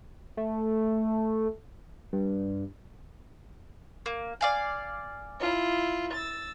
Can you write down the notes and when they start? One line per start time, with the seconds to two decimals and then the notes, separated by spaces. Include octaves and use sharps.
0.37 A3
2.13 G2
4.06 A#3
4.41 D5 F5 G#5
5.39 E4 F4
6.12 E6 A6